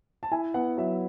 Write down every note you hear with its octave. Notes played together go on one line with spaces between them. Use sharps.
A5
E4 G#5
B3 F#5
F#3 E5